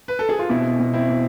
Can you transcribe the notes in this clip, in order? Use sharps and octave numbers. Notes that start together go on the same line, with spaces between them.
B4
A4
G#4
F4
B2 C4 E4
B2
C4 E4
B2